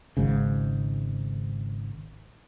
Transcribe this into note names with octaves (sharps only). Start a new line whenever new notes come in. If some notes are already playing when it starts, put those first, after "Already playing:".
G#1 G#2 C#3